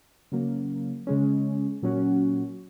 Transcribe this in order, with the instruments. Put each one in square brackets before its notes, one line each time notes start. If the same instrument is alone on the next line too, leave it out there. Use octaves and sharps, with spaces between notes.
[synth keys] C#3 F#3 A#3
C#3 G#3 C#4
A#2 F#3 C#4 F#4